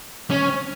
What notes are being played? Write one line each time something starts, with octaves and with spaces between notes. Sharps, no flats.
C#4